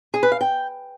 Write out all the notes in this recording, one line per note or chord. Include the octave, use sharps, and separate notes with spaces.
G#4
B4
F5
G5